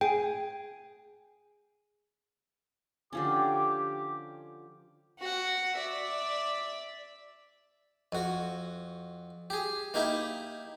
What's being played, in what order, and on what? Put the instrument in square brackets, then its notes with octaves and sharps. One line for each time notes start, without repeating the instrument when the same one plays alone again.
[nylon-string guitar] G#4 [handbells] G5
[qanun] D3 F3 C#4 [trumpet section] G4 D6
[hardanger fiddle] F#4 F#5
D5 E5
[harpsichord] F2 F#4
G4 G#4
A#3 D#4 E4 G4